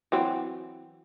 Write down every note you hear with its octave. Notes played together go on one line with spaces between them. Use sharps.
E3 F#3 C4